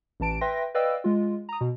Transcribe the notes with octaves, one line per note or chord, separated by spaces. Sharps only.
A1 E3 A5 D7
B4 E5 G5 C6 A#6
B4 D5 D#5 F5 G5 E6
G#3 F4
A#5 D#6
B2